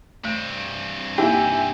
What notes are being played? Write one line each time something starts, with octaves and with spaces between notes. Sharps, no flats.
G2 A3 C4
A#3 D#4 E4 G4 G#5